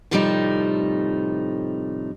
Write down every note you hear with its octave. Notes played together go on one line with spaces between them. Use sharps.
A2 C3 F3 G3 A3 D#4